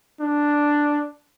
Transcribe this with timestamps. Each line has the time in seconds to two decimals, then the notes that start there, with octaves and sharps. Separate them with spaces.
0.20 D4